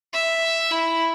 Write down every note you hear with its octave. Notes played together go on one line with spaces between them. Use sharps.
E5
E4